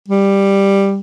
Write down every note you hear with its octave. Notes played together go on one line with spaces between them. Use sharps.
G3